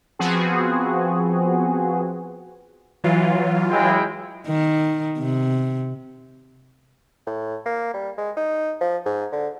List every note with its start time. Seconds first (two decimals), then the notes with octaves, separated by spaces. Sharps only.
0.19 F3 B3 C4 F#4 G#4
3.04 E3 F#3 F4
3.70 G#3 E4 G5
4.47 D#3
5.19 C3
7.27 A2
7.66 A#3
7.94 G3
8.18 G#3
8.37 D#4
8.81 F3
9.06 G#2
9.32 D3